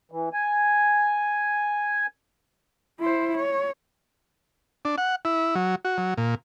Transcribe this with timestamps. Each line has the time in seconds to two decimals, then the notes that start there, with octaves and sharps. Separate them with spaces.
0.11 E3
0.33 G#5
3.00 E4 C5
3.37 C#5
4.85 D4
4.98 F#5
5.25 E4
5.55 F#3
5.85 F#4
5.98 F#3
6.17 A#2